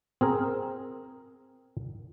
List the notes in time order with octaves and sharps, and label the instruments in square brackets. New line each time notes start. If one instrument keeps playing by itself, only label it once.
[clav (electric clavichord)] C4 G#4 A#4